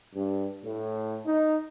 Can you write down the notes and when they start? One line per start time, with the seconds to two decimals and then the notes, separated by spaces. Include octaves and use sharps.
0.14 G2
0.64 A2
1.26 D#4